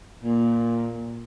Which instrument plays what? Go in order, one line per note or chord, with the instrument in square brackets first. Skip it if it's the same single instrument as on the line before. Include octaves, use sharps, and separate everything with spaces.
[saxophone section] A#2